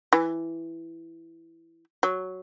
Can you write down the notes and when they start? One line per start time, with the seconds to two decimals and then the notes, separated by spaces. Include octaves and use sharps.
0.13 E3
2.03 F#3